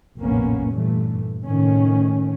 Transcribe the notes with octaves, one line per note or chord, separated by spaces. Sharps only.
F1 A#1 A2 A#3 B3 C#4
G2 A#2 E3 A3
A2 C3 D#3 A3 C#4